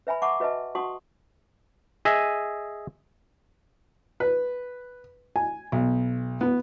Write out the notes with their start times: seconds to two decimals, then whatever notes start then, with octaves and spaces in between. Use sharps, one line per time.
0.07 B4 E5 G#5 B5
0.22 E5 F#5 A5 B5 C#6 D6
0.40 F#4 B4 D#5 E5 A5
0.75 F#4 F#5 A5 C6 C#6 D#6
2.05 G#4 D#5 E5 G#5
4.20 B4
5.36 G#5
5.72 B1
6.41 B3